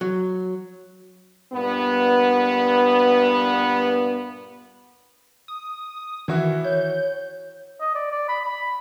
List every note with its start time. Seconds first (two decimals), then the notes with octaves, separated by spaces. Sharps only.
0.01 F#3
1.53 G2 A#2 B3
5.48 D#6
6.28 D#3 E3 E4 F#4
6.64 C#5 G6
7.80 D#5
7.95 D5
8.12 D5
8.28 B5
8.45 B5